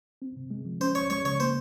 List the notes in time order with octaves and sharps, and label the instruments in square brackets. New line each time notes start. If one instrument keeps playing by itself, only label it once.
[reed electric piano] C4
C3
G#3
F3
[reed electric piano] C#4 [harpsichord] C5
[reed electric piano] C#2 [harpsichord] C#5
[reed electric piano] G#3 [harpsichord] C#5
[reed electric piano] C#3 [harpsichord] C#5
[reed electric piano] A#3 [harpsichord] C5